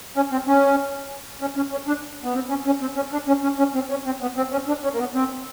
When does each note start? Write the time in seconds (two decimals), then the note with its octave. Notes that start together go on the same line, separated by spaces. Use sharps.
0.16 C#4
0.32 C4
0.48 C#4
1.41 C#4
1.56 C#4
1.72 C#4
1.88 D4
2.24 B3
2.34 C4
2.50 C#4
2.66 C#4
2.81 C4
2.96 C#4
3.13 D4
3.28 C#4
3.43 C#4
3.59 C#4
3.75 C4
3.90 C#4
4.06 C4
4.22 B3
4.37 C4
4.52 C#4
4.68 D4
4.84 C#4
4.94 A#3
4.99 B3
5.15 C4